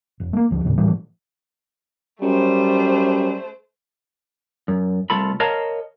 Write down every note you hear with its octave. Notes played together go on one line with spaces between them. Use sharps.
F1
A3 A#3
D2 F3
D#2 A2 C#3
A2 E3 F3 G3
F#2 G3 A3 C5
F#2
C2 A3 F4 A4 B5
A#4 C#5 D#5 F5 A5 A#5